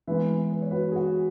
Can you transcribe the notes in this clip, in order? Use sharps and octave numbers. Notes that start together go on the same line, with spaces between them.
E3 G#3 B3 B4 E5
B4
C#5
F#4 B4
G#4
F#4